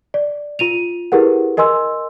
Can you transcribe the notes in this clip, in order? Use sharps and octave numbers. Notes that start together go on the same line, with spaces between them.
D5
F4 D#7 F7
E4 G4 G#4 A#4 B4 F#5
A#4 D#5 G#5 C6 E6